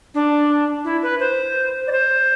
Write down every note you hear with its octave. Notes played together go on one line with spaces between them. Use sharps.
D4
E4
B4
C5
D5
C5